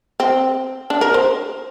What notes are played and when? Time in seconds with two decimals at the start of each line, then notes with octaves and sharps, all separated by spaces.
0.20 C4
0.90 D4
1.01 A#4
1.14 C5